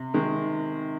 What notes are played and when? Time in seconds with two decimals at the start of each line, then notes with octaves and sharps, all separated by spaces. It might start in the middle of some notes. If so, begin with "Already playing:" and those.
Already playing: C3
0.14 D#3 G#3